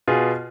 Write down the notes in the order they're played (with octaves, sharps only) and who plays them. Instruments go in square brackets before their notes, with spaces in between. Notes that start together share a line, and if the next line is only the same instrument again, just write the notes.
[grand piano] B2 B3 F4 G#4